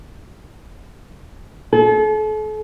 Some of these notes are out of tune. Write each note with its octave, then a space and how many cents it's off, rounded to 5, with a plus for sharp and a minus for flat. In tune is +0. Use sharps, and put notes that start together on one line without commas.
A4 -40